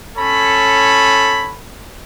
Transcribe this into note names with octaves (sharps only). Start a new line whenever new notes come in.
C#4 A4 C#5 B5